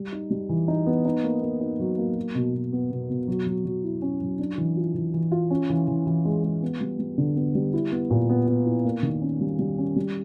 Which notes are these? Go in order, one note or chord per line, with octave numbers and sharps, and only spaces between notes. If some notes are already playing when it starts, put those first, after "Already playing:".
Already playing: G3
D#4
G3
E3
D#4
B3
D#4
A#3
A#3
D#4
F#3
A#3
F#3
B2
B2
B3
B2
B2
F#3
F#3
F#3
E4
C#4
F#3
D4
E3
F4
E3
E3
F4
C#4
E3
E3
E3
G#3
G#3
B3
G3
G3
D3
B3
G3
E4
B3
A#2
B3
B3
E4
A#3
D#3
C#4
G3
G3
C#4
G3